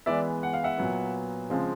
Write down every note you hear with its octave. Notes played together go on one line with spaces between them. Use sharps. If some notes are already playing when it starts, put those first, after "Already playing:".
E3 G#3 B3 D5 E5
F#5
F5
E5 F#5
A#2 F#3 B3
C#3 F3 G#3 C4